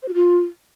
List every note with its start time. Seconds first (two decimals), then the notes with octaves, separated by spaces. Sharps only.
0.03 C5
0.08 F#4
0.14 F4